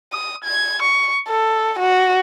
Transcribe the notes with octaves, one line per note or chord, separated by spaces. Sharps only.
D#6
G#6
C#6
A4
F#4